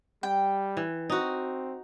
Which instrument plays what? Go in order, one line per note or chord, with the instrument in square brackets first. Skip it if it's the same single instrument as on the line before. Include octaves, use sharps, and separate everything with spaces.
[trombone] G3 [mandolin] G5
[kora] E3
[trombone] C4 [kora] D#4 F#4